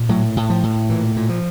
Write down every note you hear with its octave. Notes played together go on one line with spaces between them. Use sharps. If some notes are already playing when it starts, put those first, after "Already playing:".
Already playing: A#2
A2 F#3
A2
F3
A2
A#2 E3
A#2
F3